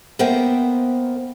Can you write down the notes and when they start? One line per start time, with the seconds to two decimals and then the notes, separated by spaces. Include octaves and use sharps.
0.19 A#3 B3 A#4 C5 E5 G5